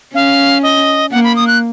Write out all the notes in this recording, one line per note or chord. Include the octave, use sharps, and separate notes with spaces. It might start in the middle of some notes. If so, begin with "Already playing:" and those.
C#4 F5
D#5
A#3 F#5
B5
D#6
F#6